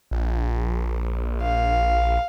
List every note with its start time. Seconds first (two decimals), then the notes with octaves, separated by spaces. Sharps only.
0.11 A#1
1.42 F5